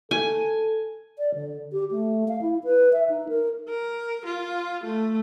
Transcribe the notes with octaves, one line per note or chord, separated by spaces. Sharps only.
A4 G#5
D5
D3
G4
A3
F5
E4
B4
E5
D#4
A#4
A#4
F4
A3